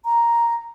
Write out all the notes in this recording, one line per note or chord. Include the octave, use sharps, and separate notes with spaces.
A#5